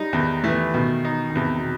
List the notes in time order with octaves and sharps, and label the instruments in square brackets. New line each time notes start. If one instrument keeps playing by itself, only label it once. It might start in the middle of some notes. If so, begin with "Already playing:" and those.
Already playing: [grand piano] G3 [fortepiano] D#4
[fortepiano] E2 [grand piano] D#3
[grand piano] E3 [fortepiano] A3
[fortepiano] B2 [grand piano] D#3
[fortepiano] D#4
[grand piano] D#3
[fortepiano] E2 [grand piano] C3
[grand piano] B2